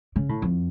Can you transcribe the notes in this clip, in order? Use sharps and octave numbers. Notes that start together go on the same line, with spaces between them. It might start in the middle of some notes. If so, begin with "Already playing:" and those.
C#3
A2
F2